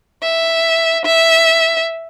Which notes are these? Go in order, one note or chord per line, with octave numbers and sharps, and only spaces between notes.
E5
E5